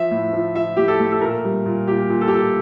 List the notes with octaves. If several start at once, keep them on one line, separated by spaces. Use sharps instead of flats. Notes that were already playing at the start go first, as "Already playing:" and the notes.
Already playing: F3 E5
A2
F3
F3 E5
A2 G4
A4
A3
A4
A#2 A#4
G3
A#2
A#2 G4
A#2
A4
G4
A#2 A4